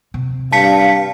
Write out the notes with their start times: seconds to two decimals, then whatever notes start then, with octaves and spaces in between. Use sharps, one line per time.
0.14 C3
0.52 G2 F5 A5 B6 C#7